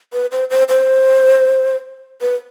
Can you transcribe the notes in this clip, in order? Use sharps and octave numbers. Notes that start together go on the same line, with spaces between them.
B4
C5
C5
C5
B4